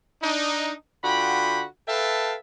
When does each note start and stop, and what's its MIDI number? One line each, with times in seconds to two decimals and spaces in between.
0.22 0.73 62
0.22 0.73 63
1.04 1.64 50
1.04 1.64 65
1.04 1.64 66
1.04 1.64 79
1.04 1.64 83
1.88 2.36 69
1.88 2.36 71
1.88 2.36 76
1.88 2.36 77
1.88 2.36 79
1.88 2.36 81